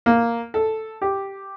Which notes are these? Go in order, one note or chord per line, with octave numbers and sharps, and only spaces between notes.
A#3
A4
G4